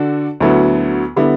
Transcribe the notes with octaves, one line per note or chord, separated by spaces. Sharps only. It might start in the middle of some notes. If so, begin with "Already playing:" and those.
Already playing: D3 D4 F#4 A4
D2 D3 F#3 B3 E4
D3 G3 B3 E4